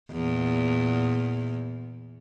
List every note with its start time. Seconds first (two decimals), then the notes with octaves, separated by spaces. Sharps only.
0.12 E2 A#2